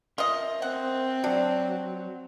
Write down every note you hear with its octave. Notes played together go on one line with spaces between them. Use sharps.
F4 A#4 D#5 E5
C4 F#5
F#3 D4 F#4